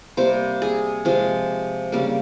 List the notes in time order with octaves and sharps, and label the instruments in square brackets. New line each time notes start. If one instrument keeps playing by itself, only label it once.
[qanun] C3 G3 A#3 C5
G#4
C3 F3 G#3
C#3 G3 A#3